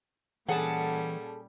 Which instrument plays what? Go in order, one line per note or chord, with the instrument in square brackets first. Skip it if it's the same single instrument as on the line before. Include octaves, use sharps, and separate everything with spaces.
[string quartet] A#2 G3 C#4 [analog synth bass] E3 [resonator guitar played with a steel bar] G#4 A4 [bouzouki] F#5 A5